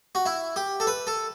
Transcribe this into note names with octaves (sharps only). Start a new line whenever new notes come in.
F#4
E4
G4
A4
B4
A4